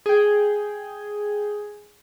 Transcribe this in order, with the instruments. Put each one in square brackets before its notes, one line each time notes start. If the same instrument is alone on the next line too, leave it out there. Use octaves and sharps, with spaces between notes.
[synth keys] G#4 G5